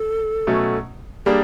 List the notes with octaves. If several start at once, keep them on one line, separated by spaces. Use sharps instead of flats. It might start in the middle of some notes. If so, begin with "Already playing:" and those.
Already playing: A4
B2 F#3 A3 C#4
G3 A#3 D4 G#4